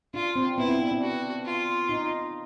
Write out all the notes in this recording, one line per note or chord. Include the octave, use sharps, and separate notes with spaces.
D4 F4
C4
B3 E4
C4
D4
D4
F#4
F4
D#4